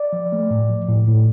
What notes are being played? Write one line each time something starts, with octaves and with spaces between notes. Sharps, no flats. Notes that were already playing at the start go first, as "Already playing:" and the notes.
Already playing: D5
F3
A3
A2
F3
A2
A2